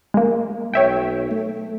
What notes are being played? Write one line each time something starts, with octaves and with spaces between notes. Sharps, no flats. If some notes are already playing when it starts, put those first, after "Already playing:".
G#3 A#3
B1 C#5 E5 G5
A3